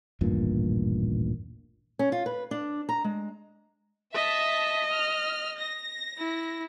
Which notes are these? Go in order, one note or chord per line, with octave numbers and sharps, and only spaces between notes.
D#1 A1 G2 A#2
C#4
F4
B4
D4
A#5
G#3
D#5 E5 A5 B6
F6
A#6
E4